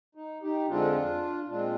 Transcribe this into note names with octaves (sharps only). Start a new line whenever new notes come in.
D#4
D#4 G4
F2 D3 G#3 C4 D4 F4
A#2 G#3 C4 D4 F4